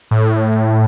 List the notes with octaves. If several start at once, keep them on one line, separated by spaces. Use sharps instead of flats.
A2